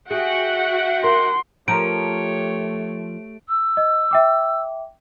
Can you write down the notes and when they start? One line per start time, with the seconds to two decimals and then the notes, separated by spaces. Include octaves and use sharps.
0.10 F#4 G#4 E5 F#5 G5
1.04 A#4 C6
1.68 F3 A3 G4 A#4 C#5 D7
3.49 E6
3.77 D#5
4.11 E5 G5 D6